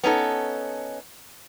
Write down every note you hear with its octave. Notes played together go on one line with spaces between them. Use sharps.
B3 C#4 D#4 A4